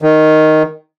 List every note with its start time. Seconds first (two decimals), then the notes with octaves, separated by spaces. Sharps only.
0.01 D#3